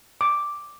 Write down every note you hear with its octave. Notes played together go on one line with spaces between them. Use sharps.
D6